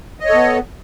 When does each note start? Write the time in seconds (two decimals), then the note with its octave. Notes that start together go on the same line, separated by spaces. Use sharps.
0.20 D#5
0.25 C#5
0.29 A4
0.34 B3